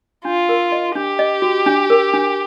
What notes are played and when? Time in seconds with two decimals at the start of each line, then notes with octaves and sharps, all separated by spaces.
0.25 D4 F4
0.49 A#4
0.72 D#5
0.95 D4 G4
1.19 D#5
1.42 F#4
1.66 D4
1.90 A#4
2.13 D4